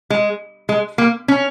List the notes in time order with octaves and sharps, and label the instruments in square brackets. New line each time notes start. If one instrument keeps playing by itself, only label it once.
[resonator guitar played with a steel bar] G#3
G#3
A#3
C#4